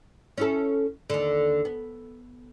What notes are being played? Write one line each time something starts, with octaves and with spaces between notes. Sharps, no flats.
C#4 E4 A4
D#2 D3
B3